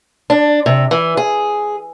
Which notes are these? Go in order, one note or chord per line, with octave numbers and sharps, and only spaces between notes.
D4
C3
E3
G#4